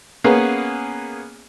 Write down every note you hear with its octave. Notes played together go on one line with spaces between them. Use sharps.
A#3 B3 C#4 G#4 B4